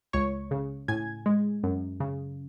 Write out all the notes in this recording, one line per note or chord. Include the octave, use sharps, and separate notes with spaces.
C#2 C#5 C#6
C#3
A2 G#5 G#6
G#3
F#2
C#3